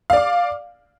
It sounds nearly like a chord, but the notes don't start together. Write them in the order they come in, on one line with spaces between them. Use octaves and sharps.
F5 D5 D6